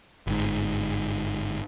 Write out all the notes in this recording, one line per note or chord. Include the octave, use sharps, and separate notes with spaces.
G1 G#2